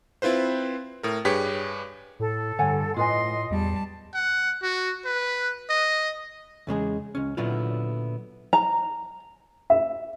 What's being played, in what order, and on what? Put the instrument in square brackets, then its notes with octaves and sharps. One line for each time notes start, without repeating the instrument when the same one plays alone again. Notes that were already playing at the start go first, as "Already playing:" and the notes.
[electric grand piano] C4 E4 F4 B4 C5
A2 A#4
G2 G4 G#4 B4 C#5 B6
[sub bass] A2 [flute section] A4
[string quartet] G2 [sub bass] D3 [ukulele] C#5 F#5 G#5
[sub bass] A2 [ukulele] F4 B4 G#5 [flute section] D#5 [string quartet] C6
[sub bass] E2 [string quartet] G3 A5
[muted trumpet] F#5
F#4
B4
D#5
[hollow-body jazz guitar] E2 C#3 G#3 G#4
C#2 C#4
A#2 D3 F#3 B3 E4 F4
[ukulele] A#5
[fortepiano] E5